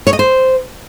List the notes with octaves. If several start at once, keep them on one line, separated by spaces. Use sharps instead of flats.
C#5
D#5
C5